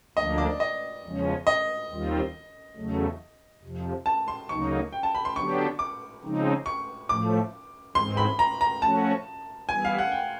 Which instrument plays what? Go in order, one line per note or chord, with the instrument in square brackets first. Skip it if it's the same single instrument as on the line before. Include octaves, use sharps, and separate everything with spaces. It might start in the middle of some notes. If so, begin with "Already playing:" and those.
[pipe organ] D2 D3 F3 A#3 D4 [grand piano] D#5
[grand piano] D5
D#5
[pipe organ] E2 C#3 F3 G#3 C#4
[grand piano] D#5
[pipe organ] D#2 D#3 G3 C4 F4
E2 C#3 F#3 A3
F2 C3 F3
[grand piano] A5
C6
[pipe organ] D2 C#3 F#3 A#3 D#4 [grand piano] C#6
[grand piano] G5
A5
B5
C6
[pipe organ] D3 F#3 B3 D4 G4 [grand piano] C#6
[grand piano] D6
[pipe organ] C#3 F3 G#3 C4 D#4
[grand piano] C#6
[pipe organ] A2 F3 A3 [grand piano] D6
[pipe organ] G#2 E3 G#3 C4 [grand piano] C6
[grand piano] B5
A#5
A#5
[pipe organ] F3 A3 C#4 F#4 [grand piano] A5
[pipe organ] E3 G3 B3 E4 [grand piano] G#5
[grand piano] F5
F#5
G5